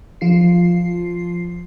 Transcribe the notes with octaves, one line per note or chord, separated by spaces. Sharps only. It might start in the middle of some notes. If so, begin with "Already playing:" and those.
F3 F4 C7